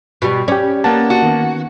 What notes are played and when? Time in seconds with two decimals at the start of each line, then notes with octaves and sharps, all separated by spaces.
0.22 B2 G3
0.48 C#4 G4 D5
0.84 A#3 B3 F#5 A5
1.10 F#4
1.23 D#3 B3